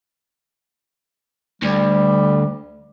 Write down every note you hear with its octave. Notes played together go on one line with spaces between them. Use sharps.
D2 G3